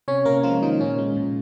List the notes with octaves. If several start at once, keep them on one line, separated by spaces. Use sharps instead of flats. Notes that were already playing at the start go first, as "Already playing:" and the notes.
C3 C#4 C#5
C3 A#3 A#4
F3 G#3 F4
D#3 F3 D#4
A#2 C#4
G#3
A#2